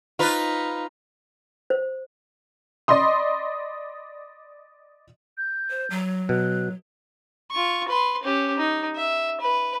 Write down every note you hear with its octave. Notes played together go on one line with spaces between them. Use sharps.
D#4 F4 B4
C5
D5 D#5 B5 C6 D#6
G6
C5
F#3
B2 F#6
F4 C#6
B4 C6
C#4 G4
D#4
E5
B4